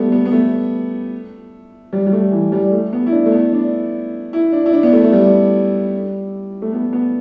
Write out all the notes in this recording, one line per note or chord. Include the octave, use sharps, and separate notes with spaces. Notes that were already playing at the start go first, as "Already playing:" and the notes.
Already playing: G3 A3 B3
B3
B3
A3
G3
G3
A3
E3
G3
A3
B3
E4
D4
A3
B3
D4
E4
D4
E4
D4
B3
A3
A3
G3
A3
B3
B3